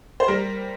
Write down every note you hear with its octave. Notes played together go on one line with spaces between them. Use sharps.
C5
G3 A#4